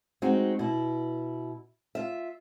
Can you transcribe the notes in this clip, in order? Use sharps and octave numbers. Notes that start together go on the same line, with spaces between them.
G#3 C4 D#4 F#4
B2 E4
F4 E5